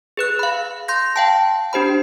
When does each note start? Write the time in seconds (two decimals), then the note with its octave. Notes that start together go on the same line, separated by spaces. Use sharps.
0.17 G#4 B4 F#6
0.39 F5 B5
0.88 C6 G6 A#6
1.16 F5 G5 A5
1.73 D4 G4 C5 B5